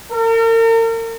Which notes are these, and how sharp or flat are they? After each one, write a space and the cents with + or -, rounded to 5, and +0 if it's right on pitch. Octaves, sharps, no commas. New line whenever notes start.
A#4 -40